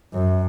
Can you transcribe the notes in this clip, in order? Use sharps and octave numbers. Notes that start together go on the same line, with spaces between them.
F#2